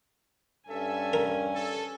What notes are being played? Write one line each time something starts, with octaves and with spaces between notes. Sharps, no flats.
G2 C#4 A4 E5 G#5
A#4
A4